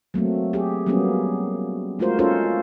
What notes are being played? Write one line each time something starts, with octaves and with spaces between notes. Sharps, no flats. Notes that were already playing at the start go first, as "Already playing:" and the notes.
F#3 A3 A#3 C4
G4 G#4
F#3 G3 A#3 B3 C#4 G#4
G#3 A3 F4 F#4 A#4 C5
C#4 D#4 F4 A4 C5 C#5